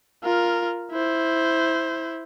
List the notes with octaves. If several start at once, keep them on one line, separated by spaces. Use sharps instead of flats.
F4 A#4
E4 C5